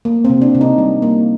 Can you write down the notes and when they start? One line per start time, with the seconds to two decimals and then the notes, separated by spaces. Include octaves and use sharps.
0.05 A#3
0.25 C3 C4
0.42 D4
0.55 C3
0.61 D#4
0.78 G3
1.02 A#3